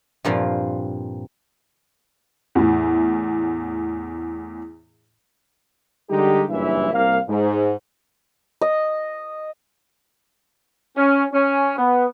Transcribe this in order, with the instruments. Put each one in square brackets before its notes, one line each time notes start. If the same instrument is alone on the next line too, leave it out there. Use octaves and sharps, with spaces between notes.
[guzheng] G2 A#2 F3 C4
[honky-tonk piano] E2 A2
[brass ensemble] D3 G3 G#3 D#4 G4
F#1 G2 A#2 E3 E4 E5
C2 A#3 F5
G#2
[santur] D#5
[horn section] C#4
C#4
B3